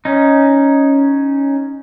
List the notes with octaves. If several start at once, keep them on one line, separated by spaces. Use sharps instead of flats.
C#4 D#4